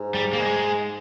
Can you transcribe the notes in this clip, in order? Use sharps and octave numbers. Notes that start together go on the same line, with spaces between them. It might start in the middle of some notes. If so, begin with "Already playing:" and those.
Already playing: G#2
G3
A#3
G#3